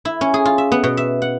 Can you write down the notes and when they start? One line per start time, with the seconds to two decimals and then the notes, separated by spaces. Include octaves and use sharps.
0.05 E4
0.21 C#4
0.34 G#4
0.45 F4
0.58 E5
0.72 B3
0.84 B2
0.97 E5
1.22 F#5